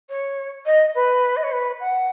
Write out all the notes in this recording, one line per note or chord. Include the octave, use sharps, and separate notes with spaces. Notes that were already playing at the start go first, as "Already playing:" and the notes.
C#5
D#5
B4
D#5
C#5
B4
F#5